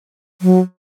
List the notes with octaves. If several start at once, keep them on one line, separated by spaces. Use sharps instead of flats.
F#3